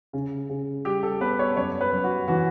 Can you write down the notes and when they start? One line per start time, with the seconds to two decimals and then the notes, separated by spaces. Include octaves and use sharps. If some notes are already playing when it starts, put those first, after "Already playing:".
0.13 C#3
0.49 C#3
0.85 G3 G4
1.03 A4
1.21 B3 B4
1.39 C#5
1.56 F#2 C#5
1.81 B4
1.92 F#2
2.04 F#4
2.28 E3 F#4